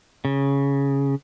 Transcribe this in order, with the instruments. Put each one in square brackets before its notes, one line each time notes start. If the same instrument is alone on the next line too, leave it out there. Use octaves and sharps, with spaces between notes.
[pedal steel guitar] C#3